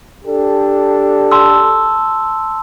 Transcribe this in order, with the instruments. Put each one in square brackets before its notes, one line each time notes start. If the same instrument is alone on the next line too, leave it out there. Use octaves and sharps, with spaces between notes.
[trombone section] D4 G4 A4
[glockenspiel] A5 C6 E6